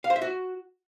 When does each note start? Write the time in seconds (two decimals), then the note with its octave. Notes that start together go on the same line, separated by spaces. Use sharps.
0.04 F5
0.10 C5
0.16 E5
0.22 F#4